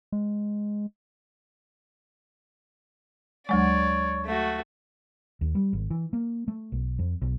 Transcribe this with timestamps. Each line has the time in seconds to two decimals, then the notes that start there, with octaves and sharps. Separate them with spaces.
0.12 G#3
3.49 D2 F#3 G#3 C#5 D5
4.25 A3 F#4
5.41 D#2
5.55 G3
5.73 G#1
5.90 E3
6.13 A#3
6.48 A3
6.72 B1
6.99 F2
7.22 B1